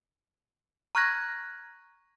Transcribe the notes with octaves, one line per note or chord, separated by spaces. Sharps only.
A#5 C#6 F6 F#6 G#6 A#6